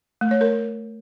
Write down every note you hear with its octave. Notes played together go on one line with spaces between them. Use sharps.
A3
C#5
A#4